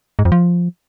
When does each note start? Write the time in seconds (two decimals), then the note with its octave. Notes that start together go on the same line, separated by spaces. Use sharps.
0.19 G#2
0.25 F2
0.32 F3